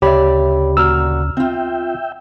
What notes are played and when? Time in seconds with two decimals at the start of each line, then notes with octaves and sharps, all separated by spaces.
0.02 D2 C#3 G4 C#5 D5 E5 B5
0.77 A#2 F#4 A#5 E6 F6
1.37 C4 F4 E5 G5